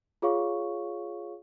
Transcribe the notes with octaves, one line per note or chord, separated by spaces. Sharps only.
F4 G#4 C#5 F5 C#6